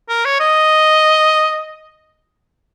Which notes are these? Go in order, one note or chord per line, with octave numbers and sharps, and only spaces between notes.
A#4
C#5
D#5